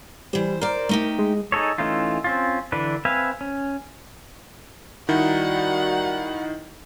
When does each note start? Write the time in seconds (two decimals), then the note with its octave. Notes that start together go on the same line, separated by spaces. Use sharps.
0.33 E3 G3 C5
0.61 A#4 C5 D5
0.89 A3 D#4 G4
1.19 G#3
1.52 D#4 G#4 A4 C#5
1.78 E3 A3 C#4 D#4 F4
2.24 C4 C#4 F4
2.72 D3 E3 D4 B4
3.05 C4 B4 E5 F5 G#5
3.41 C#4
5.09 D#3 G3 D#4 E4 F#4 F#5